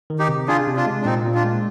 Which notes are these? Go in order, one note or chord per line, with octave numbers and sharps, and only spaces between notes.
D#3
D#4 G4
C3
D4 F4 G#4
C3
D4 F4
G#3
D4
A#2 C4 D#4
A#2
D4 F4
G#3